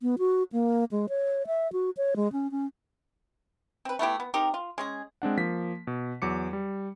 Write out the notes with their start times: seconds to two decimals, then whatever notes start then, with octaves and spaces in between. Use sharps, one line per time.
0.02 B3
0.19 F#4
0.52 A#3
0.91 G#3
1.09 C#5
1.47 E5
1.73 F#4
1.97 C#5
2.16 G#3
2.32 C#4
2.51 C#4
3.85 C4 B4
3.99 A3 B3 E4 G4
4.20 B3
4.34 C4 D#4 G4 A#4
4.54 F4
4.78 G#3 C#4 G#4
5.22 G#3 C4 D4 F#5
5.37 F3 A#3 B6
5.87 B2
6.22 E2 F#3 D6 C#7
6.53 G3